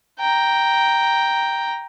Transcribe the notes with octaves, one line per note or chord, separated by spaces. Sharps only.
G5 A#5